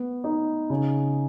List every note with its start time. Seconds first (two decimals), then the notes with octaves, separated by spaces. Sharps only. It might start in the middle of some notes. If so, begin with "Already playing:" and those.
Already playing: B3
0.24 D#4
0.70 C#3